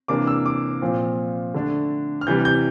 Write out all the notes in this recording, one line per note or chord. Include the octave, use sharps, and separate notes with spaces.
C3 E3 A#3 D4 D6
E6
D6
A#2 F3 C4
D3 A3 D4
F6
C3 E3 G3 G6
G6